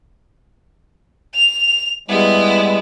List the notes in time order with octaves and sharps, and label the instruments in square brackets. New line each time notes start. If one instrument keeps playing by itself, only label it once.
[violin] F7
[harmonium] G3 G#3 [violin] B3 E4